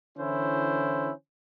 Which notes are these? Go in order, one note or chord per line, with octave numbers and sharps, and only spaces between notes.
D3 E3 C#4 E4 C5